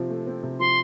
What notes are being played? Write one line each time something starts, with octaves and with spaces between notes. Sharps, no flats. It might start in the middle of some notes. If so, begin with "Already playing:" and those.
Already playing: C3 F3 C4
A3
C4
C3
F3 C6